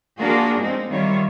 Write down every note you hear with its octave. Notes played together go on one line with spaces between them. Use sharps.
A#3 D4 F4 F#4 G#4 A#4
G#3 A#3 C4 D#4
D#3 F#3 G3 F4 C#5 E5